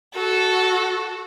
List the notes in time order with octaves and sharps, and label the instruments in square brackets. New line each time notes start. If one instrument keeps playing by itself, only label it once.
[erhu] F#4 [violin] A4